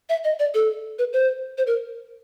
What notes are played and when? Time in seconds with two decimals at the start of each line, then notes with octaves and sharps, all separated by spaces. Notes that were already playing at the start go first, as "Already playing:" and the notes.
0.09 E5
0.24 D#5
0.39 D5
0.54 A4
0.99 B4
1.13 C5
1.58 C5
1.67 A#4